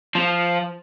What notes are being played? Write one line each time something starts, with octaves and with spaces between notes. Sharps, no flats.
F3